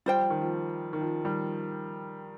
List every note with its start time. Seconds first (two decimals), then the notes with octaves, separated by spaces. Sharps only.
0.06 G3 F4 C5 G5
0.18 F3
0.30 D#3
0.41 F3
0.93 D#3
1.01 F3
1.25 D#3 G3